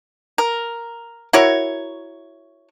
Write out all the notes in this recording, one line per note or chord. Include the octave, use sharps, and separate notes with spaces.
A#4
E4 F#4 A#4 C#5